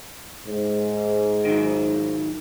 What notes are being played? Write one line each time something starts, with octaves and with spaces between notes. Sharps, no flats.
G#2
D#3 F#3